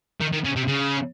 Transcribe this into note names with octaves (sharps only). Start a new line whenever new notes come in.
D#3
D#3
C#3
C3
C#3